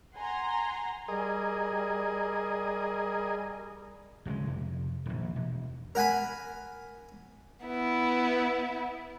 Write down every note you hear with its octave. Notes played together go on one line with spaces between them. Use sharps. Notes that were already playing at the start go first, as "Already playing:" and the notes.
F#5 G#5 A#5 C6
G3 G#4 A#4 D#5
D1 C#3 G#3
F1
D#1 A#1
E1
A#4 F#5 G#5 B5
B3 E4